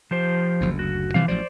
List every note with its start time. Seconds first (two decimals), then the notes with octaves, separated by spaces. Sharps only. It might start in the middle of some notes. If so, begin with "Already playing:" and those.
0.11 F3 G4 C5
0.61 F#1 D2
0.79 F#4
1.14 C3 E3 F3 G3 F5
1.28 A1 F3 F#3 C5 D5